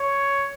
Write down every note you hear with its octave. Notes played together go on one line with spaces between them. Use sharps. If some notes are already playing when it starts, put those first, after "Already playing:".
Already playing: C#5